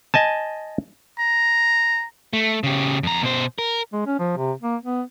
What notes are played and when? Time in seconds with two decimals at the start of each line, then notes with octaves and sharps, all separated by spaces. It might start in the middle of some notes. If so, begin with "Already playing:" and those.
0.14 D#5 G#5 A5
1.19 A#5
2.33 A3
2.63 C#3 G4
3.03 F2 A#5
3.23 B2 C5
3.59 A#4
3.93 G#3
4.06 C#4
4.19 F3
4.37 C3
4.62 A#3
4.84 B3